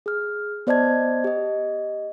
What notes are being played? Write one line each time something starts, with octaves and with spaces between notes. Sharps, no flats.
G#4 F6
B3 C5 D5 D#5 A5 G#6
G4 D#5